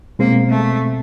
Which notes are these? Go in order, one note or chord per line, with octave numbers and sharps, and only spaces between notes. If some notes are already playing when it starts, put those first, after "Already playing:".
B2 G#3 A#3 C4
A3